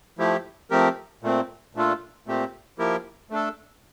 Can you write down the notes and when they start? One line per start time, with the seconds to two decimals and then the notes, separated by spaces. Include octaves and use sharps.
0.18 F3 A3 E4 G4
0.70 F3 A3 C4 G4 A#4
1.23 A#2 A3 C4
1.75 A#2 A3 D4 F4 A4
2.27 A#2 A3 C4 G4
2.78 F3 A#3 E4 G4 A#4
3.30 A3 D4 A4